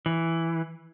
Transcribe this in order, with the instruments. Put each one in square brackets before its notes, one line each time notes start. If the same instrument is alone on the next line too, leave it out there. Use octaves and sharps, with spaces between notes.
[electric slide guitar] E3